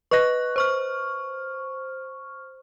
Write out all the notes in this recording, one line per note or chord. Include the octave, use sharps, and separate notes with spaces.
B4 D#5 C#6 F#6 A#6
C5 C#6 F6